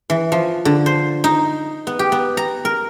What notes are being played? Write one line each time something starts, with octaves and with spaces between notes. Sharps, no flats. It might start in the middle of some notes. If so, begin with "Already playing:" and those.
E3
F3
D3
C5
D#4
B3
G4
B3
A#5
A#4